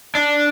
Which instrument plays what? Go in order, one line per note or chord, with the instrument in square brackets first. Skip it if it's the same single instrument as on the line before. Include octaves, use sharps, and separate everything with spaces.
[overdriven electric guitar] D4